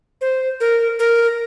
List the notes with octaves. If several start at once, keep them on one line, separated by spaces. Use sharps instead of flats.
C5
A#4
A#4